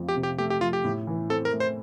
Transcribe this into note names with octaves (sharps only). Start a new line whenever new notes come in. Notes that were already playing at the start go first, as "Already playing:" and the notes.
Already playing: F2 F3 A3
G4
C3
G4
A3 G4
G4
F3 F4
G4
A2
E3
C4 A4
A#4
A3
C5